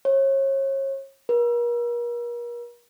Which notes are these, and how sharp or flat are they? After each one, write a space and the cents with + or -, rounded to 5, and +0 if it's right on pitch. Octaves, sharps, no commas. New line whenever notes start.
C#5 -35
A#4 +40